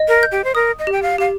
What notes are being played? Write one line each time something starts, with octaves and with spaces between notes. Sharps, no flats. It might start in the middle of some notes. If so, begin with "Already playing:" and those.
Already playing: D#5
A#4
G6
G4
C5
A#4 D#6
D#5
G4
G5
F5
G4 F5